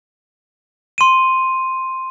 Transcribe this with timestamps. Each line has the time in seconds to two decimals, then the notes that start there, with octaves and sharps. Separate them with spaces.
0.98 C6 D#7